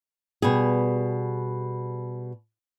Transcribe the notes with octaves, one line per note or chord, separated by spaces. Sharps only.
B2 G3 G#4